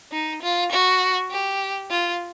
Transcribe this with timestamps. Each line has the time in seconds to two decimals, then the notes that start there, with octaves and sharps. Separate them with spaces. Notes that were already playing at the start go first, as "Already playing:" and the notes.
0.12 D#4
0.42 F4
0.72 F#4
1.31 G4
1.91 F4